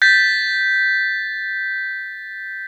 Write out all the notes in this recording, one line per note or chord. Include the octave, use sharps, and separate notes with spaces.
G6 A6 B6